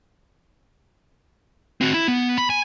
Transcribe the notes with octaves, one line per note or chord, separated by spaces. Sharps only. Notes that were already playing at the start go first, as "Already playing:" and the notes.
C4 F#4
E4
B3
B5
G#5